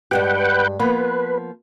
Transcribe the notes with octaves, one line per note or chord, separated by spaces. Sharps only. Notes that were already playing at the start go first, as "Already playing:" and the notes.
G2 G#3 G4 B4 F#5 G5
F3 A#3 B3 B4